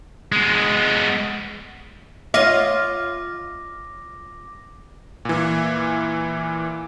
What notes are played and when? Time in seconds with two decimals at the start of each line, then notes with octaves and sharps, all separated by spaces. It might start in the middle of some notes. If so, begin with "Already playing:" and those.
0.32 G#3 B3
2.34 F4 C#5 D#5 E5 D6 A#6
5.25 A#2 E3